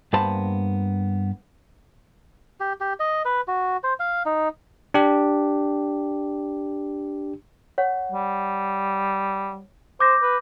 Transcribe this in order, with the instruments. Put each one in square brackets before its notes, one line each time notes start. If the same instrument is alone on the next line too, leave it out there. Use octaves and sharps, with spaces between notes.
[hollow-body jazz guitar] G2 A#3 B3 C5 A5 B5
[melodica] G4
G4
D#5
B4
F#4
C5
F5
D#4
[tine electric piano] D4 G4
[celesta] C#5 F#5
[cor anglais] G3
[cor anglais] C5 [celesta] D6 G6 A#6
[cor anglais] B4